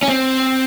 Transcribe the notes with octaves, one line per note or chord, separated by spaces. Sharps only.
C#4
C4